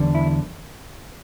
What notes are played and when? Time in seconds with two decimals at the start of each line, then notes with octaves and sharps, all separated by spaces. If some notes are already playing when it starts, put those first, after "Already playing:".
Already playing: E2 D3 G3 D4
0.15 E4